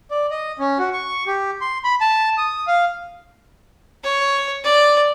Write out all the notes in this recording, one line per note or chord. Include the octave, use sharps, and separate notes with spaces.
D5
D#5
C#4
F#4
C#6
G4
C6
B5
A5
D#6
F5
C#5
D5